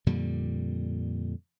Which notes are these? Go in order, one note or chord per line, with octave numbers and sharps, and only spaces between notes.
F2 A#2 D3 G3